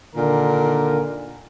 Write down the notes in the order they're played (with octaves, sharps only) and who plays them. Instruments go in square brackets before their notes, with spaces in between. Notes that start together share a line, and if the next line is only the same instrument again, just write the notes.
[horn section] A#2 D3 D#3 A#4